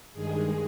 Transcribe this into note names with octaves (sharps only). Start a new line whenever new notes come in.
G2 D#3 G#3 G#4